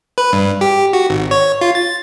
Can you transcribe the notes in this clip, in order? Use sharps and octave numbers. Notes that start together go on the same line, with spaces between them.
B4
G2
G4
F#4
G#1
C#5
F4
A6